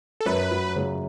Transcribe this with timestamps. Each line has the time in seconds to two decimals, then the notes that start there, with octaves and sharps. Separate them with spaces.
0.21 A4
0.26 F#2 B4
0.51 F#3
0.76 C#3